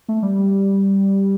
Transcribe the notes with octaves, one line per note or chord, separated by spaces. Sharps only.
A3
G3